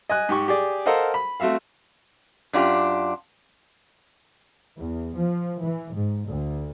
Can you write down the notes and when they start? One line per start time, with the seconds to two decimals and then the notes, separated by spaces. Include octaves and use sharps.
0.09 D#5 G#5 F#6
0.29 G#2 G4 C#6
0.48 G4 G#4 D5
0.86 A4 A#4 C5 D#5 F5 F#5
1.14 B5
1.40 A3 C4 F#4 E5 F5
2.53 F#2 D4 F4 G4
4.77 E2
5.15 F3
5.63 E3
5.94 G#2
6.26 D2